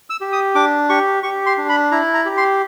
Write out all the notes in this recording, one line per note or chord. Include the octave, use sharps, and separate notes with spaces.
E6
G4
D#6
D4 D6
G4 C#6
G4 C#6
C6
D4
B5
E4 A#5
A#5
G4
C6